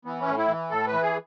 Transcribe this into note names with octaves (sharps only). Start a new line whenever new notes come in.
E3 B3
C#4
A2
E4
E3
A2 A4
B4
E3
G#4